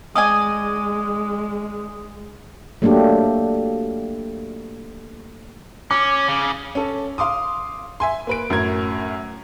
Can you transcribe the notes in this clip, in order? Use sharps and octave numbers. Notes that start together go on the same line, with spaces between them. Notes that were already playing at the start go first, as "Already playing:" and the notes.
G#3 D5 D#5 G#5 D#6
F#3 A3 A#3 D4 G4
C#4 D6
C#3
C#4 A4
F5 C6 D6 D#6
E5 G#5 C6
A#3 B4 D7
F#2 A2 A#4 G#6